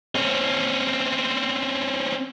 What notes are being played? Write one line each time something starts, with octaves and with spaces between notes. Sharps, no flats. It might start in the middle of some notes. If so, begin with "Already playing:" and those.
C4 C#4